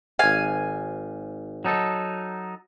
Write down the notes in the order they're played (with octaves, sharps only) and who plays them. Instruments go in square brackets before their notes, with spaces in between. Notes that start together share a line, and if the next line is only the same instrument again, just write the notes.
[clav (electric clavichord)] G#1 F5 [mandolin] G#5
[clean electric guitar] F#3 D#4 A4